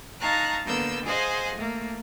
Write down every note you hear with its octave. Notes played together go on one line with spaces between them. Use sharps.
D#4 F5 A5 A#5 C#6 F#6
D3 A#3 B3 E6 G6
G#4 C5 D#5 F5 F#5 G#5
A3 A#3